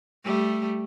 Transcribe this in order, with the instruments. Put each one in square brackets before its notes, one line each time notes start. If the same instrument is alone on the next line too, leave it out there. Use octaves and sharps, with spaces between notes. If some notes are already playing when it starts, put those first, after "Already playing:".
[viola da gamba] G3 A3